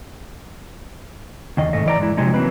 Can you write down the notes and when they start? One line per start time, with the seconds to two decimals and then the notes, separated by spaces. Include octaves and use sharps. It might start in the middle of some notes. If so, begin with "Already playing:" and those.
1.57 E2 D#3 D#5
1.73 G#2 A3 D#5
1.86 E3 D5 A#5
2.00 G#3 E4
2.17 C3 F3 F#3 G#3 D#4
2.34 E3 F#3 A#3 C4 B4